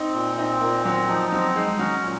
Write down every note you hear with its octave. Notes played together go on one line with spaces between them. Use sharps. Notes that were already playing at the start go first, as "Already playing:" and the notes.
Already playing: C4 D#4
A#2
C4 D#4
A#2 A#3
F#3 C4
F3 D#4
F#3 C4
G#3 D#4
F#3 C#4
A#2